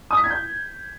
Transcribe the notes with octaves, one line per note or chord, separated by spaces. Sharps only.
D#6
B6
G#6
G6